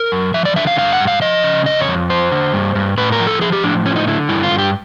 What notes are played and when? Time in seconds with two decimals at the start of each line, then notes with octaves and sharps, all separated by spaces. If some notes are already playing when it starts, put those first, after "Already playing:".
Already playing: A#4
0.12 F#2
0.34 F3 E5
0.45 D5
0.56 D3 E5
0.67 F5
0.78 G2 F5
0.93 F#5
1.00 G2
1.07 F5
1.22 F3 D#5
1.44 C#3
1.66 F2 D#5
1.81 C#5
1.88 F2
2.10 F3 C5
2.32 D3
2.53 G2
2.75 G2
2.97 A2 B4
3.12 A#4
3.20 F3
3.27 A4
3.41 F3 G#4
3.52 G4
3.63 A2 D4
3.85 F3 C#4
3.96 D#4
4.07 D3 E4
4.29 G2 E4
4.43 F4
4.51 G2
4.58 G4